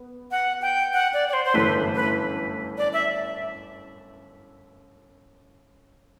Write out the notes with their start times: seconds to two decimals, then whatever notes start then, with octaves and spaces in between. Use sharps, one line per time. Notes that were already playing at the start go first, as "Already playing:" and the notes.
Already playing: B3
0.31 F#5
0.62 G5
0.93 F#5
1.14 D5
1.29 D5
1.33 C5
1.45 C5
1.54 G1 F#2 E3 A3 B4
1.95 B4
2.78 D5
2.93 E5